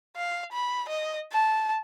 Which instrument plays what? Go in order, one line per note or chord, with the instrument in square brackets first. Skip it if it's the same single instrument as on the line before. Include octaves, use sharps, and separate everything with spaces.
[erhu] F5
B5
D#5
A5